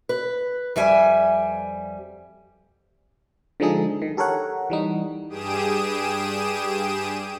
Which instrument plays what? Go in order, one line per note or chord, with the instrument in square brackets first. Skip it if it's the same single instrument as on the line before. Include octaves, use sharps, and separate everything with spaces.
[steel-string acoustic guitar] B4
F2 G3 E5 G#5
[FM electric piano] D3 F3 G#3 D#4 G#4 A4
D#3
G4 A4 A#4 C#5 F#5
E3 G3 D#4
[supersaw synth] G2 G4 G#4 D#6 D7 E7